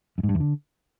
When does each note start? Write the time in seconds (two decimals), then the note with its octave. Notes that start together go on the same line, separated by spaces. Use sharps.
0.18 F#2
0.23 G#2
0.29 G2
0.35 E2
0.40 D3